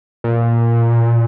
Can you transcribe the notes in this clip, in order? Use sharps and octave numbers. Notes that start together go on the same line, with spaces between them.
A#2